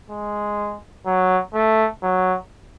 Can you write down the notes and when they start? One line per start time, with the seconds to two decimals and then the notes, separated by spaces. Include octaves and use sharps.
0.10 G#3
1.06 F#3
1.54 A3
2.03 F#3